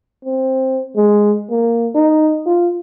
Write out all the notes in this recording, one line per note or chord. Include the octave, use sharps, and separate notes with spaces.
C4
G#3
A#3
D#4
F4